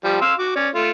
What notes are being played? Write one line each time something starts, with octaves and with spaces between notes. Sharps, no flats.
F3 G3
F5 C6 E6
F#4 D6
C#4 D5
A3 F4